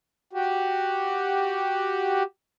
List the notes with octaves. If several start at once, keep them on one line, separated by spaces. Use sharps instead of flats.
F#4 G4